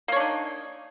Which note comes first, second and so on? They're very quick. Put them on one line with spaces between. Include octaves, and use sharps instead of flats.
A#3 C#5 D4 D#4